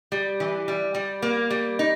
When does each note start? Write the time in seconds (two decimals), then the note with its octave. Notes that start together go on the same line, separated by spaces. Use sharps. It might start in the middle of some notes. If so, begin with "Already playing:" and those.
0.12 G3
0.40 E3
0.68 G3
0.95 G3
1.22 A#3
1.50 G3
1.79 D#4